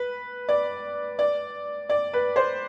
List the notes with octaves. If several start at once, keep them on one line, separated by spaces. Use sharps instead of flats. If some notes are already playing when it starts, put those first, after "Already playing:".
Already playing: B4
D5
D5
D5
B4
C5